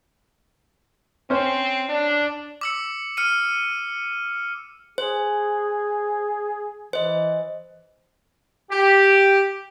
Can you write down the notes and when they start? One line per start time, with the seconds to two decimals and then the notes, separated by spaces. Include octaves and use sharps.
1.30 C4 C#4 C5
1.89 D4
2.61 D6 E6 C#7
3.17 F6 C#7 D#7
4.98 G#4 C5
6.93 E3 C5 D#5
8.71 G4